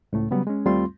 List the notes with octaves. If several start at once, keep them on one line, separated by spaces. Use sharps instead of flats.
C#2 A2 A3
C#3 F#3 G3 B3
G#3 C#4
D#2 G3 A3 C4 F4 C6